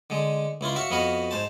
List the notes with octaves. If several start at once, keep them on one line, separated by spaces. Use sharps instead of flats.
D3 G#3
C#2 E4 F4 C6
F#4 E5 F5 C#6
F2 B3 F#4 B4 D#5 F5
G#2 C5 A5